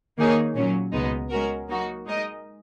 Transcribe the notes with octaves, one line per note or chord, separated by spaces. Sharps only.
D#3 A#3 D#4 G#4 C#5
A#2 F#3 C#4
C#2 B2 G#3 B3 D#4
G#3 C#4 F#4 A#4
F#3 A#3 D#4 F#4
G#3 D#4 A#4 D#5